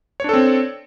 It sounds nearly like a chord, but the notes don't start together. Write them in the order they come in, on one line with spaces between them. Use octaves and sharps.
C#5 D4 A4 C4